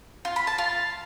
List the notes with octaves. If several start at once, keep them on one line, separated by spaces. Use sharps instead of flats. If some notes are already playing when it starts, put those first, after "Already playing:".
F4
B5
A5
F4